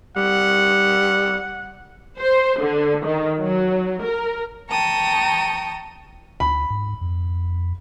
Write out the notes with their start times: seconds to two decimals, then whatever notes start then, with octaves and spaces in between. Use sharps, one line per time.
0.16 G3 F#5
2.19 C5
2.60 D3
3.05 D#3
3.40 F#3
4.02 A#4
4.69 G5 A5 A#5 C#6 D#6
6.40 D2 B5
6.70 G#2
7.01 F2